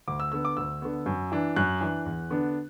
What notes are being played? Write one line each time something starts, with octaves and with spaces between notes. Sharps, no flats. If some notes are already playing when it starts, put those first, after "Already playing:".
D2 D6
E6
D3 B3 E6
D6
D2 E6
D3 B3
F#2
E3 D4
F#2 F#6
E3 D4
E2
D3 B3 D4